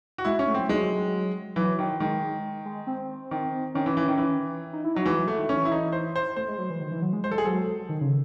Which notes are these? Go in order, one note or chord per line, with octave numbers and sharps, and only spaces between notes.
F#4
G#3 E4
C#4
A3
F#3 C4
F#3 G#3
E3 F#3
D#3
D#3 G#3
G#3
C4
D#3
D#3 C#4
E3
E3
D#3
E3
D#4
E4
F#3 D#4
E3 G#3
F#3
A3
D#3
E3 C#4
E4
D#4
C5
C5
A3 C5
G#3
F#3
E3
D#3
E3
F#3
G#3
G#3 C5
A4
G#4
F#3 A4
D#3
C#3